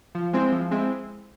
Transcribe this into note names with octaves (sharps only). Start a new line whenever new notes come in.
F3
G#3 C4 E4
F3
G#3 C4 E4